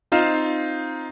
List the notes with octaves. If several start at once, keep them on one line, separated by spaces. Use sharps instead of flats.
C4 D#4 F4 F5 E7